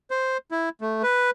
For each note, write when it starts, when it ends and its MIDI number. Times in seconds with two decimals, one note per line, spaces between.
0.11 0.37 72
0.51 0.69 64
0.81 1.02 57
1.03 1.30 71